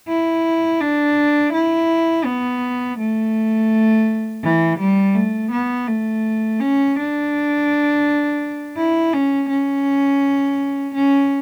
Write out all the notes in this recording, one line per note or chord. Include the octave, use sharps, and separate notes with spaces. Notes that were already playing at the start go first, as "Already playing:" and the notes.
E4
D4
E4
B3
A3
E3
G3
A3
B3
A3
C#4
D4
E4
C#4
C#4
C#4